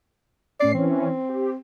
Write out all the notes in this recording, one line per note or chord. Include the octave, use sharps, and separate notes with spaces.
A2 C#4 D5 C7
E3 C4 C#4
G4